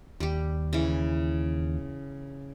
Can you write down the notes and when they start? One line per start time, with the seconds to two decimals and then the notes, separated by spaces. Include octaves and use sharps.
0.20 D#2 G3 G4
0.73 C#3 E3